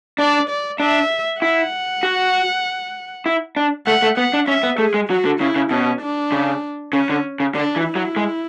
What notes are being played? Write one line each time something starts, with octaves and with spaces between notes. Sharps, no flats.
D4 D5
D5
D4 E5
E4 F#5
F#4
E4
D4
A3 F#5
A3
B3 F#5
D4
C#4 E5
B3
A3 G#4
G#3
F#3 F#4
D3
C#3 E4
C#3
B2 C#4
D4
C#3
C#3 C#4
D3
C#3
D3 D4
E3
E4
F#3
G#3